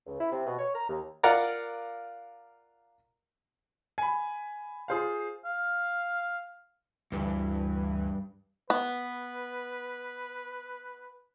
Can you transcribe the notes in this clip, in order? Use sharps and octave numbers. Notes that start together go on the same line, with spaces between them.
C#2
E4
C3
B2
C#5
A#5
D#2
F4 A#4 D5 F#5 A#5
G#5 B5
F4 G#4 C5 F5
F5
D2 G2 E3
B3 B4